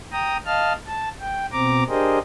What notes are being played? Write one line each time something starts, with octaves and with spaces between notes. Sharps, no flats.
G5 A#5 D#6
D#5 F5 A5 F6
A5
G5
B2 C4 A#5 D6
D4 G4 G#4 A#4 C5 D#5